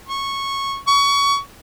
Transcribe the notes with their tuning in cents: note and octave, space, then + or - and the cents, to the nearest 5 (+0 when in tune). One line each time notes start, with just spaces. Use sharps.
C#6 -10
C#6 +25